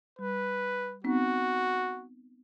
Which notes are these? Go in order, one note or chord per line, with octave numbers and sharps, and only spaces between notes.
G3 B4
B3 C4 D#4 F#4